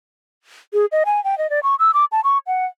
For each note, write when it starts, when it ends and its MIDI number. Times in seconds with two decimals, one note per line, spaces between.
0.74 0.86 68
0.92 1.04 75
1.06 1.23 80
1.24 1.38 79
1.38 1.50 75
1.50 1.60 74
1.63 1.75 85
1.79 1.91 88
1.94 2.05 86
2.12 2.21 81
2.24 2.38 85
2.47 2.66 78